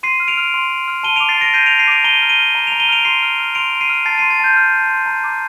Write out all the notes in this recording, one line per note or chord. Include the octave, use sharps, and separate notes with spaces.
C6 C7 D#7
F6
D7 F7
F6
C6
C6
F6
A5 D#7 G7
D6 D7 F7
A6 C7
A5 A#6 D7
G6 C7 D#7
A5 D7 F7
C7 D#7
D6 D7 F7
A#5 D#7 G7
F6
D#7 G7
F6
A#5
A#5 D7 F7
D#7 G7
F6 D7 F7
C6 C7 D#7
F6
F6
C6 D7 F7
C6
C7 D#7
F6
A5 A6 C7
C6 C7 D#7
A6
A5 G6
F6
A5
C6
A#5
D6